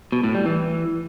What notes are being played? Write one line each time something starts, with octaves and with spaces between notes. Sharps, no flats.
B2
A2
G3
E3